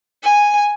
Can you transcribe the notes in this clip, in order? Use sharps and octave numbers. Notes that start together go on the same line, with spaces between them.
G#5